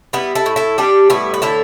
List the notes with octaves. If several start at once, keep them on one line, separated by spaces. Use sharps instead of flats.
G3 B3 E4
E4 A4
A2
E4 A4
G3 D4 G4
A2 B3 E4
B4
D3 E4 A4